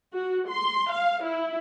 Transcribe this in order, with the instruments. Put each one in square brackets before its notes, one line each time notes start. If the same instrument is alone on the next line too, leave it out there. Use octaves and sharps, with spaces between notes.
[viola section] F#4
C6
F5
E4